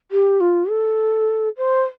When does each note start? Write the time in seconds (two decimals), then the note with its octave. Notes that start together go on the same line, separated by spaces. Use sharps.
0.11 G4
0.40 F4
0.70 A4
1.57 C5